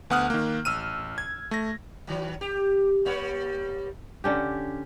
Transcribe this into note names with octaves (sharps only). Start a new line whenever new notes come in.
D2 B3 F#5 D#6 F6 F#6
D#3 A#3
A1 E6 F6 D#7
G#6
A3 A#6
D#3 F#3
G4
G3 A#3 C#5
D3 C#4 G4